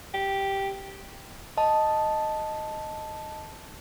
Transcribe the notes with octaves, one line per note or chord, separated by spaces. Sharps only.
G4
D#5 A5